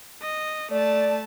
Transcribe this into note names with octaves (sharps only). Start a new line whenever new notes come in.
D#5
A3 D5 A5